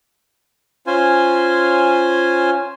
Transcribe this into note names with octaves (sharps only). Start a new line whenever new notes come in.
C#4 F4 C5 G#5